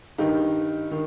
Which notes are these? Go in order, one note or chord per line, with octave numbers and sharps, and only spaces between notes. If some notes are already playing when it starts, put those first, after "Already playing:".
G2 D#3 D#4 G4
D#3